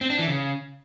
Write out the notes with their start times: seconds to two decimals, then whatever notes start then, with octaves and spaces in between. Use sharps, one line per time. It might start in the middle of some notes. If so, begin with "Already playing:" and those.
0.01 C4
0.10 D4
0.19 E3
0.28 C#3